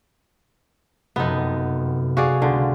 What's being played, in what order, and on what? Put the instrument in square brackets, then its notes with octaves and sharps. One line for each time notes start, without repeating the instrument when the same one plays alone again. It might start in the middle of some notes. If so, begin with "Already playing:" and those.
[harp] F1 F#2 C3 [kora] B3 D#4
[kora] F#4 G#4 D5 [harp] F5
[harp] C#2 [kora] D3